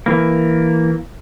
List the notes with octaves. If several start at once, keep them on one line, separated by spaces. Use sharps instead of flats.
E3 A#3